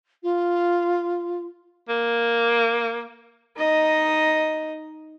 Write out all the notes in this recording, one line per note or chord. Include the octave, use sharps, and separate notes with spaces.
F4
A#3
D#4 D#5